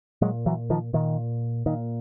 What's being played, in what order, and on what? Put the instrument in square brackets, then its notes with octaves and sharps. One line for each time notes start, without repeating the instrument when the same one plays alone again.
[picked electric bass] A#2 F#3 G#3
E3 F#3
D#3 F3
A#2 D#3
A#2 D#3